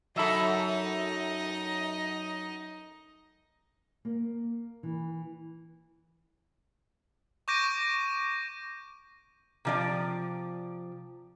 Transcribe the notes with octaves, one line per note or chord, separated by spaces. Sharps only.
F#2 F#3 D#4 A4 D#5 E5 B5
A#3
E3
C#6 D6 G6 A#6 D7 D#7
C3 F3 D5